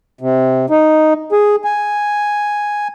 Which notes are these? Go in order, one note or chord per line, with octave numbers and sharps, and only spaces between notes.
C3
D#4
G#4
G#5